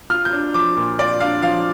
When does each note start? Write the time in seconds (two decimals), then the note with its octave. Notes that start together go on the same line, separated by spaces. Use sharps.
0.10 F4 F6
0.25 G6
0.33 D4
0.54 F3 D6
0.77 A#2
0.99 F4 D5
1.20 D4 F5
1.42 F3 F5